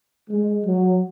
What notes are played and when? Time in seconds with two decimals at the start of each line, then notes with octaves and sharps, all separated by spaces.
0.29 G#3
0.65 F#3